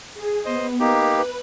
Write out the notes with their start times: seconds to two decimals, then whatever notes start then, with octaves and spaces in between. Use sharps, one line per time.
0.14 G#4
0.45 B3 C5 D#5
0.80 A#3 D#4 G4 B4